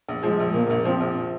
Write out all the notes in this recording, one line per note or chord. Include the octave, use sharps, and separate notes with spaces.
A#1
F3 G#3
A#1
A#2 A#3
A#1
F3 C4
A#1